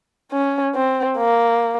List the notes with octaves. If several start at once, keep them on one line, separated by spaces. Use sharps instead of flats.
C#4
C4
A#3